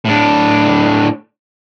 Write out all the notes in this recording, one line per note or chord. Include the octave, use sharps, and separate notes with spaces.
A2 D4